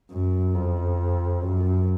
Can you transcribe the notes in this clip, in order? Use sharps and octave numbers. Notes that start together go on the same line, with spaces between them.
F#2
F2
F#2